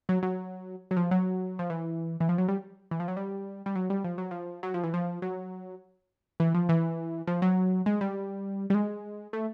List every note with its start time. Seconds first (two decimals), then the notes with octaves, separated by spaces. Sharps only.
0.09 F#3
0.23 F#3
0.91 F#3
0.97 F3
1.11 F#3
1.59 F3
1.70 E3
2.20 E3
2.29 F3
2.38 F#3
2.48 G3
2.91 E3
3.00 F3
3.08 F#3
3.17 G3
3.66 G3
3.75 F#3
3.90 G3
4.04 F3
4.18 F#3
4.31 F3
4.63 F#3
4.74 F3
4.84 E3
4.94 F3
5.22 F#3
6.40 E3
6.55 F3
6.69 E3
7.27 F3
7.42 F#3
7.86 G#3
8.01 G3
8.70 G3
8.75 G#3
9.33 A3